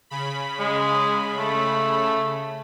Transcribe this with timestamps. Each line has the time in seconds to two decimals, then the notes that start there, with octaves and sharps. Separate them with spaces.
0.10 C#3 B5
0.60 G#3
1.37 A3